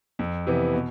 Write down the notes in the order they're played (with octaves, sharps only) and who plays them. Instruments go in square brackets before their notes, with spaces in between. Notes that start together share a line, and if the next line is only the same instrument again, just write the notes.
[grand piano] F2
C3 E3 B3
B2